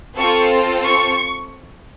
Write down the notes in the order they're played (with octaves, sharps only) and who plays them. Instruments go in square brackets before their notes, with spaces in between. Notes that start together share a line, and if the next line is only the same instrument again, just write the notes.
[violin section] C4 F4 A4 C#6
C#6